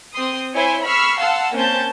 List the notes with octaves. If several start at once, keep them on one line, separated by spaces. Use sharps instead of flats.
C4 C6 D#6
E4 C5 C#5 E5 G#5 C6
B5 C#6 E6 F6 B6 C7
F5 F#5 A5 C6 E6
A#3 C4 C#4 C5 A5 G6